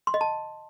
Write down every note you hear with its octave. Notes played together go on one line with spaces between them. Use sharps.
C6
D#5
A5